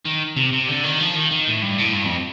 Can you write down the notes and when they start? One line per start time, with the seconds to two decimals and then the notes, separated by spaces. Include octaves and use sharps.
0.05 D#3
0.37 C3
0.53 C3
0.68 D3
0.84 D#3
1.00 F3
1.16 D#3
1.31 D#3
1.47 A2
1.63 G2
1.79 A2
1.94 G2
2.05 F2